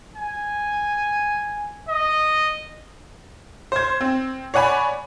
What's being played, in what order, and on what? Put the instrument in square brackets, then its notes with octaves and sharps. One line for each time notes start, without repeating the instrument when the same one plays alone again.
[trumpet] G#5
D#5
[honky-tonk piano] C5 G#6
C4
C#5 D5 F#5 G#5 B5